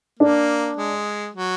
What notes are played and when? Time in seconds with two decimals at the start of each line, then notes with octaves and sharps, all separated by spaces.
0.19 A#3 D4
0.77 G#3
1.34 F#3